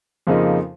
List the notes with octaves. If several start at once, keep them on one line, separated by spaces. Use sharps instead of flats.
F2 C#3 F3 A#3 D#4